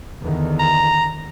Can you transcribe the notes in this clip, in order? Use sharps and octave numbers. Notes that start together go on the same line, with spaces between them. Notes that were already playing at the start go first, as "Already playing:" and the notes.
E2 D3 D#3
A#5